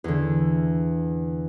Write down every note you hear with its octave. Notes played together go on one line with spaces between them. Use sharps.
E2 D3